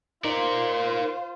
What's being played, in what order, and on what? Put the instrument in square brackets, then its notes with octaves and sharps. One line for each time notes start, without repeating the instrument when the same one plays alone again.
[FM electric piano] D#4 [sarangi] F4 [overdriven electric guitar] A#4 D5 [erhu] C5